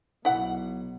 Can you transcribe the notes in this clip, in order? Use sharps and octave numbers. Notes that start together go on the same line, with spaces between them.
B1 B2 E4 F#5